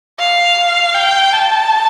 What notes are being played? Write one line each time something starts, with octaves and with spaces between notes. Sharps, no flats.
F5
G5
A5